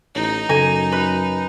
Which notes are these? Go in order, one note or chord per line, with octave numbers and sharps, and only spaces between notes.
A1 D#4
F#2 C#3 A4 G#5 A#6
B4